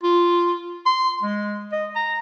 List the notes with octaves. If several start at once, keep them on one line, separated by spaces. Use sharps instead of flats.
F4
C6
G#3
D#5
A#5